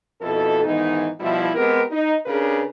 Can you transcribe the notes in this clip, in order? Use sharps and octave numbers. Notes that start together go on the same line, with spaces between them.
F2 B2 E4 A4
G#2 D#3 E3 B3 D#4
B2 F3 G3 E4
G#3 B3 C4 G4 A#4
D#4
C#3 D4 G4 G#4 A#4 B4